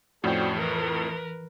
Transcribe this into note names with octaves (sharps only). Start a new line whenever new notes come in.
F2 A2 C#4 F#4 C5 D5 G5
E3 A#4 B4